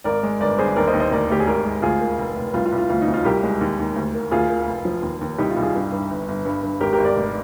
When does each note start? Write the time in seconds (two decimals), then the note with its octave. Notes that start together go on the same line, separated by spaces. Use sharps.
0.04 G#1 A#4 D5
0.23 G#3
0.40 G1 A#4 D5
0.58 G1 G#4 C5
0.76 D#2 A#4 D5
0.87 C5 D#5
0.93 D#2
1.00 C5 D#5
1.12 D2 A#4 D5
1.30 D2 G4
1.40 G#4
1.47 G#1 G4 A#4
1.65 G#3
1.82 D2 F4 G#4
2.00 A#3
2.19 F1
2.36 F1
2.54 C2 F4
2.66 F4
2.72 C2
2.78 F4
2.89 D2 F4
3.01 D#4
3.08 D2
3.14 F4
3.25 C2 G4 A#4
3.43 G#3
3.61 D#2
3.79 D#2
3.96 D2
4.14 A#3
4.31 D2 F4 G#4
4.49 A#3
4.68 F1
4.85 F3
5.02 D#2
5.21 D#2
5.38 C2 D#4 G4
5.50 F4
5.57 C2
5.63 F4 G#4
5.75 G2
5.92 G2
6.10 G1
6.28 G1
6.45 G2
6.63 G2
6.80 G#1 G4 A#4
6.93 G4 A#4
6.98 G#1
7.04 A#4 D5
7.16 F1